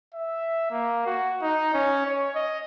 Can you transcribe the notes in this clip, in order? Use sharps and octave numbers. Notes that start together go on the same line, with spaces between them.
E5
A#3
F#4
D#4
C#4
C#5
D#5